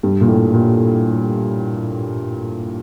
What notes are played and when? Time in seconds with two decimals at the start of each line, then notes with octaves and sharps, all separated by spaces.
0.03 G2
0.21 A#2
0.28 A2
0.54 A#2